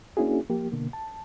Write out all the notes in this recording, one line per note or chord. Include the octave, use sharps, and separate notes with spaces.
A#3 C#4 D4 E4 F#4 G#4
F3 A#3 G4
B2 D3 A#3
A5